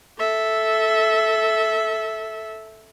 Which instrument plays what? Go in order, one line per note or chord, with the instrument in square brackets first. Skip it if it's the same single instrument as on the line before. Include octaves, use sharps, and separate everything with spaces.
[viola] A4 E5